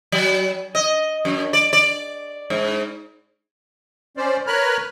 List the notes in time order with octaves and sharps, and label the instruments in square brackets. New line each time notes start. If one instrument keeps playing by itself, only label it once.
[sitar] F#3
D#5
F#2
D5
D5
G#2
[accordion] C#4 C5 D5
A#4 B4 C#5 B5 F6 F#6